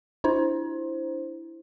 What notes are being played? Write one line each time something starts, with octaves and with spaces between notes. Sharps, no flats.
D4 E4 C5